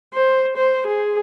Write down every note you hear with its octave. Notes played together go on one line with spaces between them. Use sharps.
C5
C5
G#4